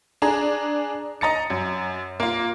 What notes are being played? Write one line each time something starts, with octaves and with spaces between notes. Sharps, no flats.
D4 G#4 A#5
D#5 A#5 A6 C#7
F#2
A#3 F4